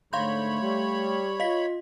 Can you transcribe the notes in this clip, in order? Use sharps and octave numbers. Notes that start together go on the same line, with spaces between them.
G#2 D3 A3 C#5 F5 B5 C6 G6
G3
F4 D#5 F5 B6